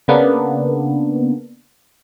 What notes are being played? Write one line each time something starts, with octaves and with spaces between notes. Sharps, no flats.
C#3 A#3 B3 D4